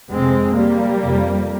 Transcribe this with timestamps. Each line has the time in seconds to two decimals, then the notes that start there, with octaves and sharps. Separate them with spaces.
0.11 F2 C3 G#3 C4
0.55 G3 A#3
1.01 F2 C3